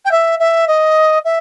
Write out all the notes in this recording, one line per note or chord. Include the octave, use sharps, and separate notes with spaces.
G5
E5
E5
D#5
E5